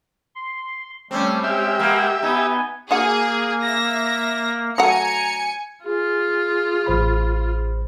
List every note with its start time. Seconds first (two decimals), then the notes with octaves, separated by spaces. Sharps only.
0.35 C6
1.11 G3 A3 C4 C#4
1.44 G#3 G4 E5 G5 F6
1.80 A#3 B3
2.23 B3 D#4 G#5
2.91 A#3 D4 F#4 G#4 F#5
3.63 E5 A#6
4.78 F#3 A3 F#5 G#5 A#5 C#7
5.85 F4 G#4
6.86 A1 C5 B5